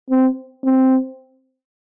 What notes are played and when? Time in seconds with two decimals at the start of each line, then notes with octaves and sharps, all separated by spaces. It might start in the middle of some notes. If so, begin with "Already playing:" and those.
0.10 C4
0.64 C4